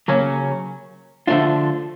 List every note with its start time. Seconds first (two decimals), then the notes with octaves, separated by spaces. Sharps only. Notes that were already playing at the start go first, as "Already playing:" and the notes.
0.08 C#3 F#3 A#3 C#4
1.27 D3 F3 A3 D4 F4